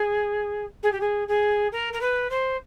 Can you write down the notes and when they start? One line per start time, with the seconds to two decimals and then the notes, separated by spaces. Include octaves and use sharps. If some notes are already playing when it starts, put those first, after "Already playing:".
Already playing: G#4
0.83 G#4
0.92 G4
1.00 G#4
1.28 G#4
1.72 A#4
1.93 A#4
2.01 B4
2.30 C5